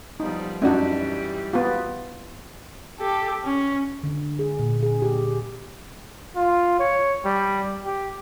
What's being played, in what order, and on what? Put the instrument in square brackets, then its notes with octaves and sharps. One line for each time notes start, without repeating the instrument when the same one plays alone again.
[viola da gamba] F3 G3 B3 [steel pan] D#4
[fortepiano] F#2 D#4 F#4 [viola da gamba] E3 G3 G4 [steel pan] D4
[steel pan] B3 F4
[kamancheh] G4 A4
C#4
[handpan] D3
G#4
A#2
G#4
G4
[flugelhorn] F4
C#5
G3
G4